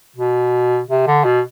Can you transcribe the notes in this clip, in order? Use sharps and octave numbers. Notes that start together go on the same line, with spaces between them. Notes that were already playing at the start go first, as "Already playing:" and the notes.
B2
C3
D3
B2